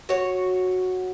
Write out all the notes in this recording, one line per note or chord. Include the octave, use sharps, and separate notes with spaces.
F#4 C#5